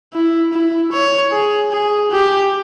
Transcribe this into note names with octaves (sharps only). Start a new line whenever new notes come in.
E4
E4
C#5
G#4
G#4
G4